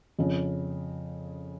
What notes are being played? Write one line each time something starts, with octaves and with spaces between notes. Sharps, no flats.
F2 C#3